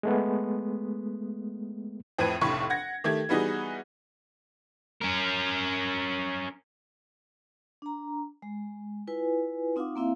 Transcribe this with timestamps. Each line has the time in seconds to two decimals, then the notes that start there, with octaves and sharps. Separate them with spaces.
0.03 G#3 A3 B3
2.19 F2 A2 C4 B4 G#6 D#7
2.41 F1 A#1 A2 B5 C#6
2.70 F#5 G#6 A#6
3.04 D#3 A3 G4 G#6
3.29 E3 G3 B3 D#4 F#4 G#4
5.02 C#4 A#4
7.82 D4 A#5
8.42 G#3
9.07 E4 F4 B4 G#5
9.76 C4 D#4 F4 F5 F#5 D6
9.96 A#3 C4 E4 E5 F5